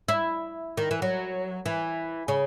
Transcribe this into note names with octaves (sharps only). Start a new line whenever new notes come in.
E4
D#3
E3
F#3
E3
C#3